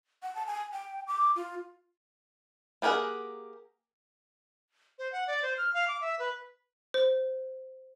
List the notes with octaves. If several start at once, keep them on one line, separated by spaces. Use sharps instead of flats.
F#5
A5
G#5
G5
D6
F4
A#3 G4 G#4 A#4 F#5
C5
F#5
D5
C5
F6
F5
D6
E5
B4
C5